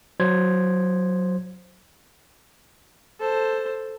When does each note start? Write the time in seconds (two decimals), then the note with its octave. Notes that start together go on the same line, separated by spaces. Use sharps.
0.20 F#3 C5 G#6
3.19 A4 C5